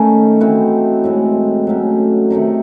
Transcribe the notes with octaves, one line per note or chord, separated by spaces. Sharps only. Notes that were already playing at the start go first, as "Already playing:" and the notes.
Already playing: D#3 A3 C#4 D#4
E3 C4 D#4 F#4
A2 G#3 C4
F#3 A3 C#4
C3 D#3 A3 D#4